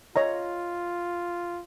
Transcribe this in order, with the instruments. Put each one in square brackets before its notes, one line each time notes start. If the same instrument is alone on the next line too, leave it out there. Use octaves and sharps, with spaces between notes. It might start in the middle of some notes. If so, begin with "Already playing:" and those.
[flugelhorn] F4 [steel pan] C#5 D#5 A#5